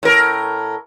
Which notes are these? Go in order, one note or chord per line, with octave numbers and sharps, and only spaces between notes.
A2 A#4